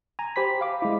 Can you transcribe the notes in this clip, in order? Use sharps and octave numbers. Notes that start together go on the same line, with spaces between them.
G#5 A#5
G4 C5 B5 B6
F5 D6
G#3 E4